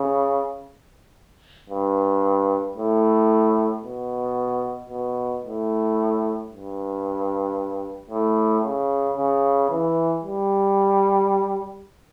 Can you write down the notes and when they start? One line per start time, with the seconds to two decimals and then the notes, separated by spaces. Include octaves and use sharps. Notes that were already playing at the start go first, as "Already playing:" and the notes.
Already playing: C#3
1.70 G2
2.77 A2
3.84 B2
4.90 B2
5.44 A2
6.50 G2
8.10 A2
8.64 C#3
9.17 C#3
9.70 E3
10.24 G3